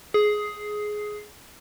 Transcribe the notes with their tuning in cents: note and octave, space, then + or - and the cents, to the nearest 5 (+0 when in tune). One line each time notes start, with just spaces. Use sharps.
G#4 +10